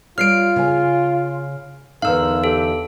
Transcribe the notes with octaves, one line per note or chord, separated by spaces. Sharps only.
G3 F4 C#5 F6 C7 D7
C#3 G#5
E2 D3 D#4 A#4 F5 E6
G4 A4